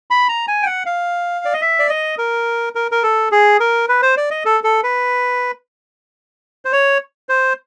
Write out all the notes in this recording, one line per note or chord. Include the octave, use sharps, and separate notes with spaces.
B5
A#5
G#5
G5
F#5
F5
D5
D#5
E5
D5
D#5
A#4
A#4
A#4
A4
G#4
A#4
B4
C5
D5
D#5
A4
A4
B4
C5
C#5
C5